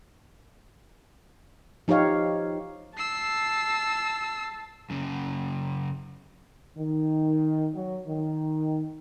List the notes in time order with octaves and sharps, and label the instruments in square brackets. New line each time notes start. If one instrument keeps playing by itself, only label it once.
[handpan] F3 D#4 G4 C#5 F5
[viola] A5 [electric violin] E6 C7
[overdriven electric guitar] F#2 C#3
[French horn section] D#3
F#3
D#3